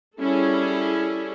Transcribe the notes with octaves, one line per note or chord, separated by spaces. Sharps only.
G3 C#4 E4 G#4 A4